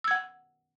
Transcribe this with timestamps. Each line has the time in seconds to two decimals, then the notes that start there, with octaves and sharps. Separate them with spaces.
0.04 E6
0.08 G#6
0.11 F#5